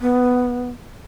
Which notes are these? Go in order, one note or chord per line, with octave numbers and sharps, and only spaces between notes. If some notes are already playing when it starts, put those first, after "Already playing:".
B3